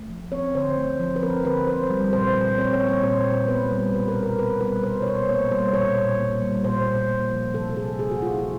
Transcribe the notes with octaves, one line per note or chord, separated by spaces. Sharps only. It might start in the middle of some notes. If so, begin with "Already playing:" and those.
Already playing: A3
F3
C4 C#5
D3 C5
A3
F3
B4
C4 A#4
D3 B4
C4 C5
G3
A#2 C5
A#2
C4 C#5
C#5
G3
C#5
A#2 C5
A#2
B3 B4
G3
B2 B4
A#4
B2
A#4
B3 B4
G3 B4
B2 C5
C#5
B2 C5
A#3 C#5
G3 C5
A#2 C#5
A#2
A#3
G3
A#2 C5
A#2
A#3
F3
C3 A4
A4
C3 G#4
A#3 G#4
F#4
F3 F4
E4